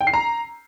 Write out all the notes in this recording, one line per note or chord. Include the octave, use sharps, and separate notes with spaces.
G5
C7
A#5